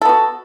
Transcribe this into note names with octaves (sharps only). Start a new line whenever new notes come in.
B3 F#4 A4